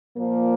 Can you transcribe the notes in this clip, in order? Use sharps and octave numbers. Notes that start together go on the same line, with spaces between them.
A#2 F3 A#3